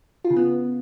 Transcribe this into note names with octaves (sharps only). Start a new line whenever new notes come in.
F4
C#3
B3